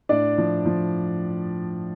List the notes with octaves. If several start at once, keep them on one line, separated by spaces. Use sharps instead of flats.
A2 D4 D5
F3
F3